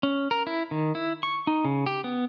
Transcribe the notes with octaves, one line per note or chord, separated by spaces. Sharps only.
C#4
A#4
E4
D#3
E4
C#6
D#4
C#3
G4
B3